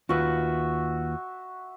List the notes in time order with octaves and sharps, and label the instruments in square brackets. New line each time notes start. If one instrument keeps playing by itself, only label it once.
[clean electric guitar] D#2 F4 B4 [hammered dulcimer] F#4 E5